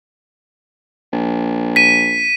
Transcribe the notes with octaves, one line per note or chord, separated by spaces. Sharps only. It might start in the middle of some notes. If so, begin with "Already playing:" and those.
A#1
B6 D#7